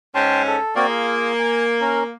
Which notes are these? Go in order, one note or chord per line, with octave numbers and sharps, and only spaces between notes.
G#2 C#4 G5 A5 C6
A4
A#3 C4 F#4 D5
F4 G#4
G#5
C#4 A#4